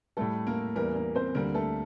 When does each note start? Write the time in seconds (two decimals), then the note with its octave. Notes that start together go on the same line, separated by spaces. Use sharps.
0.17 A2 G3 A3 A4
0.47 A#3 A#4
0.75 E2 E3 G3 A#3 A#4
0.95 A#3 A#4
1.15 C4 C5
1.35 D2 D3 G3 A#3 A#4
1.54 A3 A4